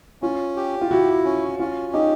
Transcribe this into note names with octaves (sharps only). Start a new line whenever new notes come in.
C#4 F4
G4
F4
E4 F#4
C#4
C#4 F4
D#4 G4